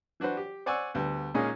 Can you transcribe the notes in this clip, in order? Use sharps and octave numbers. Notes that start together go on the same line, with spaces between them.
E3 D4 F#4 B4 C5
G4
C5 D5 F#5 G#5 C#6 E6
D2 G3 B3
A#2 G#3 A#3 C#4 D#4 G#4